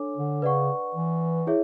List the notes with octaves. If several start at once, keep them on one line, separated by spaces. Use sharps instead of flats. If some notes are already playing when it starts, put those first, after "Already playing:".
Already playing: D4 A4 C#5 G#5 D6
D3
C#3 B4 D5 F#5 C#6
E3
E4 G#4 C#5 E5